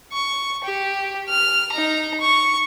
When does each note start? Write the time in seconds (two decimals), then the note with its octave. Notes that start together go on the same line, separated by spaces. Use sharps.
0.13 C#6
0.64 G4
1.29 F6
1.72 D#4 A#5
2.21 C#6